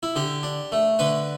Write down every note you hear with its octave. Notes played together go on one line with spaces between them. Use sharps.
E4
D3 G4
D4
A3
D3 B4